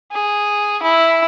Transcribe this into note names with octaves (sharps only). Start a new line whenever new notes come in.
G#4
E4